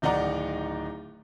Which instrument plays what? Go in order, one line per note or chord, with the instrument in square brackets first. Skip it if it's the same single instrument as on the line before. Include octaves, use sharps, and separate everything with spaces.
[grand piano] D1 D#3 D#4 D5 F#5 A#5